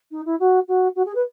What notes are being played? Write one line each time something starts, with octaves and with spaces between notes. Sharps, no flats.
D#4
E4
F#4
F#4
F#4
G#4
B4